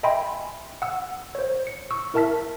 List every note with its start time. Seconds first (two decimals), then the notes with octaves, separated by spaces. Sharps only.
0.03 D#5 E5 G5 G#5 B5 C6
0.82 F#5 E6
1.35 C5 C#5
1.67 C#7
1.91 C#6 E6
2.14 E4 A#4 E5 A5 F6 B6